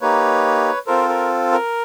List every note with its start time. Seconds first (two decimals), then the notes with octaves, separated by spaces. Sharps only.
0.01 A#3 D#4 G4 B4 C#5
0.87 C4 F4 A4 A#4 C5
1.09 A#4
1.52 A#4